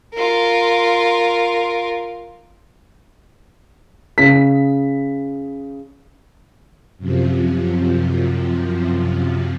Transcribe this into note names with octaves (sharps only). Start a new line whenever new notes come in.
F4 A#4
C#3 B6
F#2 C3 F3